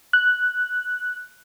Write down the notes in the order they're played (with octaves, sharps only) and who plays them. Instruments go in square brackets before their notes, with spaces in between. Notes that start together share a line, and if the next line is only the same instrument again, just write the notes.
[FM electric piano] F#6